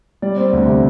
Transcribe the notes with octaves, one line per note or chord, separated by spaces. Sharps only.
G3 D5
C4
D2
C3